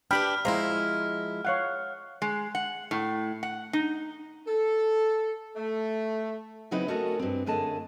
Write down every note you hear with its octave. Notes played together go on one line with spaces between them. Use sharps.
D4 G4 B4 G5 B5 F6
F3 G#3 E4 C5 F5 A#5
C#5 F5 F#5
G#3
F#5
A2
F#5
D#4
A4
A3
C#3 F#3 C4 D#4 E4 B4
A3 C#4 F#4 A4 A#4 D#5
G2 C4
F#2 D3 A3 G#4 D#5 A5